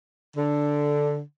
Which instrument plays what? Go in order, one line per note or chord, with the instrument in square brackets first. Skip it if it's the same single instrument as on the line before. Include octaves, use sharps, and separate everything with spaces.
[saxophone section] D3